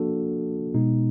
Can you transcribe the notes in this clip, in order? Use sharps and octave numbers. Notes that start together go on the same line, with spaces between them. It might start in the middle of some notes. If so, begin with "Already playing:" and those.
Already playing: F3 A#3 D4 F#4 A4
B2 G#3 B3 D#4